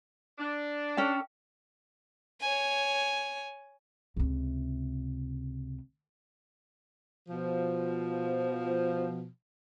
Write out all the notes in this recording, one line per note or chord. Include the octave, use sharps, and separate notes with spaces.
D4
C#4 A4 G5
C#5 G#5
C#2 C3
B2 F3